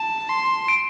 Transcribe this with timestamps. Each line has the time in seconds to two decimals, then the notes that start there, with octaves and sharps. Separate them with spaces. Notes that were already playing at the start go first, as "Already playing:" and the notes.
Already playing: A5 E7
0.29 C6
0.68 D7